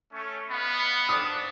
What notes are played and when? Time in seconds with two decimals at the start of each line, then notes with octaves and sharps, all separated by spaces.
0.13 A3 C#4
0.50 B3 D#5 F5 B5
1.09 D4 D#6